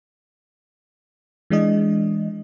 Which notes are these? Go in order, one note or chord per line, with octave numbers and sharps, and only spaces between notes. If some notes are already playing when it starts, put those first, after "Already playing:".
E3 G#3 D4 D#5